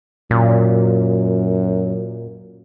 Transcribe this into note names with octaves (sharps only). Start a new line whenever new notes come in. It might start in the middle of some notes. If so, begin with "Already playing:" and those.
F#2 A#2